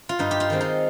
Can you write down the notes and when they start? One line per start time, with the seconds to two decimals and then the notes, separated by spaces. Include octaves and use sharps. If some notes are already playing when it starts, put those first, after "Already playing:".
0.09 F4
0.19 G2 D#4
0.31 G4
0.40 F4
0.50 D#3 G#3 C4
0.61 D#4